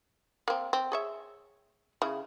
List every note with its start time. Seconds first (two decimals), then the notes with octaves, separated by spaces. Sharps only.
0.48 A#3 C4
0.73 C4
0.92 G#4 C#5 E5
2.02 C#3 E4